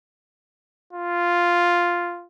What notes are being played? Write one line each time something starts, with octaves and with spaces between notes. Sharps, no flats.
F4